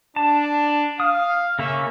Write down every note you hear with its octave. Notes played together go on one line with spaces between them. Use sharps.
D4 A5
F5 D#6
C#3 A#3 C#4 E5